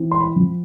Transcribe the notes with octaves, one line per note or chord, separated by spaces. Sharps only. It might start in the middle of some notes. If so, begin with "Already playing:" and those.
Already playing: E3 C4
C6
B5
F3